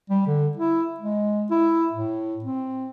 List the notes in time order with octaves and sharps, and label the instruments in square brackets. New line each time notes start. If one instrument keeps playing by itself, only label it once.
[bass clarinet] G3
D3
E4
G#3
E4
A2
C4